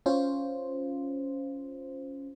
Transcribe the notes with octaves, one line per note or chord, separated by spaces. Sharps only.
C#4 F4 C5